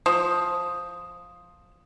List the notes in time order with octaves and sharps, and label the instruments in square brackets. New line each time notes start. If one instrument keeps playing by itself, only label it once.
[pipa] F3 [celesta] D#6